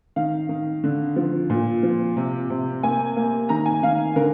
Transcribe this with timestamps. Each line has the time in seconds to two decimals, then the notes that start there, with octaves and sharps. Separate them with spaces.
0.16 D#3 F5
0.49 D#3
0.84 D3
1.16 F3
1.50 A#2
1.83 F3
2.16 C3
2.50 C3
2.83 A#3 G#5
3.17 A#3
3.49 D#3 A#5
3.66 G#5
3.82 D#3 F5
4.16 D3 A#4